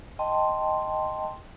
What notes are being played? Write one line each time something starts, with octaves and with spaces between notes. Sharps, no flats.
D#5 G5 A5 C6